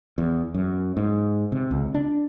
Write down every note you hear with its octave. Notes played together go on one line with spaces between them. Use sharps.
E2
F#2
G#2
C3
C#2
D4